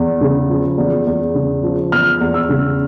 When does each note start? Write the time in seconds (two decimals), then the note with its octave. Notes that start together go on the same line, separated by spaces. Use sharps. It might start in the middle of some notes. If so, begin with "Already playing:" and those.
Already playing: E2
0.21 C#3
0.49 F3
0.78 E2
1.06 E2
1.34 C#3
1.63 F3
1.92 E2 F6
2.21 E2
2.34 E6
2.49 C#3